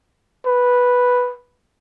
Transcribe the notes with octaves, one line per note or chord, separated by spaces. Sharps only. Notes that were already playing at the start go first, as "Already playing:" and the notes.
B4